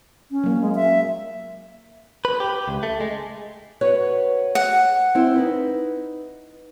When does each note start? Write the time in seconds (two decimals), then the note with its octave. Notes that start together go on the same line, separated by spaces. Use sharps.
0.31 C#4
0.44 F#3 A#3
0.62 G#3
0.75 E5
2.25 B4
2.40 G4
2.68 C#2
2.83 A3
3.01 G#3
3.81 F#4 B4 C#5
4.55 F#5
5.15 C4 E4 C5
5.36 D#4 B4